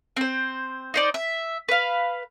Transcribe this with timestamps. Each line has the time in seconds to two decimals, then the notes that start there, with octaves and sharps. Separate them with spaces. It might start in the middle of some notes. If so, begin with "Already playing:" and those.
0.17 C4 C5
0.94 D#4 C5 D5
1.14 E5
1.69 B4 F5